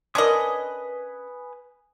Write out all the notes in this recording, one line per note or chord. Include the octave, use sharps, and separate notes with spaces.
C#4 D4 A#4 B4 D#5 G#5 C6 D#6